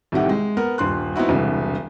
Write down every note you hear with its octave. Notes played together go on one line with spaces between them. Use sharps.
C2 A2 C3 D#3 G4 F#5
G#3
B3 A#4
D#1 G2 C6 F#6
B3 C4 D#4 E4 F#4
E1 C2 D3